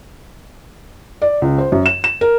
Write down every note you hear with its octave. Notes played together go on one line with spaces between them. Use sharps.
D5
C#2
C5
F#2
E7
E7
A#4